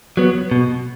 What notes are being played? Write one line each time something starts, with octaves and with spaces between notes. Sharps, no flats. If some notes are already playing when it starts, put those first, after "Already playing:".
F#3 B3
B2